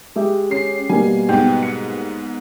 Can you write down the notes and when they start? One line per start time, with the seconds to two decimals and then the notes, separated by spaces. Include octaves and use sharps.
0.16 G#3 G4 E5
0.51 C#4 C7
0.89 B2 G3 A#3 G#5
1.29 G#2 B3 G5
1.63 C#7